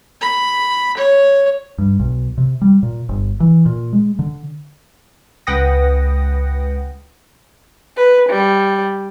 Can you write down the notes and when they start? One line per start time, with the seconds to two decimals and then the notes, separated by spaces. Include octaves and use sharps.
0.21 B5
0.97 C#5
1.78 G2
2.00 B1
2.38 C3
2.62 G3
2.83 A#2
3.09 G1
3.40 E3
3.66 A#2
3.93 G#3
4.19 D3
5.47 C#2 B4 F#5 G5 D#6 A#6
7.97 B4
8.29 G3